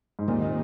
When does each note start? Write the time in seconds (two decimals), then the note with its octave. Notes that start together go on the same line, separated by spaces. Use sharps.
0.19 G#2
0.28 D#2 A#2 D#3 G3 C4 D#4